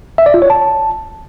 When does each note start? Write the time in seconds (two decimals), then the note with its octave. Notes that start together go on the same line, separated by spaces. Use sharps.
0.18 E5
0.26 D5
0.34 F4
0.42 C#5
0.50 A5